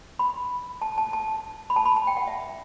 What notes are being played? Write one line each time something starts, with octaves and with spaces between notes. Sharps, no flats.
B5
A5
A5
A5
B5
A5
B5
A5
G5
F#5
E5